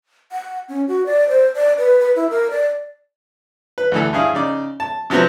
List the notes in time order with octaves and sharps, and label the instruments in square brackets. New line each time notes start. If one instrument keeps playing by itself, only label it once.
[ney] F#5
C#4
F#4
D5
C5
D5
B4
B4
E4
A#4
D5
[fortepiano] B4
D2 E3 A4
G2 E4 G#4 F5
C#3 D#4 D5
A5
C3 F3 F#3 B3 C4